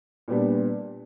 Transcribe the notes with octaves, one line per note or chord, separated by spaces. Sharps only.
A#2 G3 B3 D4